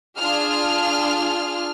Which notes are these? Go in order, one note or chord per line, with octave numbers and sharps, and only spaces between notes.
D4 F4 G#4 F6